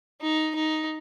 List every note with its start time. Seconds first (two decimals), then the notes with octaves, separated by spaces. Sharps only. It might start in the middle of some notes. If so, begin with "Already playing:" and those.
0.21 D#4
0.55 D#4